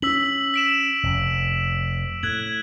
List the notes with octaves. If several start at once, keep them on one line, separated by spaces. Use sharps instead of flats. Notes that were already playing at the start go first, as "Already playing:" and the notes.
C#4 E6 B6 F#7
B6 D7 E7
F1
A2 F#6 G#6 F#7